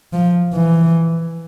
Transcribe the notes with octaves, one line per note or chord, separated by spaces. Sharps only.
F3
E3